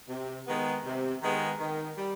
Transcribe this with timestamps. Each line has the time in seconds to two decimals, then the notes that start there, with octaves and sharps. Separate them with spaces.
0.10 C3
0.47 D#3 G#3 B3
0.85 C3
1.23 D#3 G#3 B3
1.60 D#3
1.98 G3